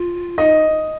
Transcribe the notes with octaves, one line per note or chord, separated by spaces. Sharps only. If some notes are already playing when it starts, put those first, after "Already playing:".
Already playing: F4
D#4 D#5